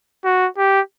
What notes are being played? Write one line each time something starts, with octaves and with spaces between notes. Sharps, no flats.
F#4
G4